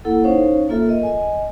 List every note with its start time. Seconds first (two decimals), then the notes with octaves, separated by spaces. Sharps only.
0.05 A#3 E4 A4 F#5
0.23 C#4 D#4 C5 C#5 F5
0.69 A#3 F4 A4 E5
0.86 A#4 D#5
1.03 D#5 G#5